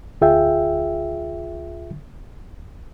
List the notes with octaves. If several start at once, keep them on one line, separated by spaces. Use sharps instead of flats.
D2 F4 G#4 E5 G5